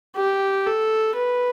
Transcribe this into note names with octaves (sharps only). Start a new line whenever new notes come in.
G4
A4
B4